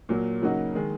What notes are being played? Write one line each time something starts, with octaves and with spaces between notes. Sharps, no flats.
A#2 F#3 A#3
C#3 F#3 A#3 D#4 F#4
D#3 G#3